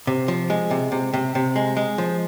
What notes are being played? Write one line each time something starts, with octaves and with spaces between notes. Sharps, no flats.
C3
F3
G#3
C3
C3
C3
C3
G#3
G#3
F3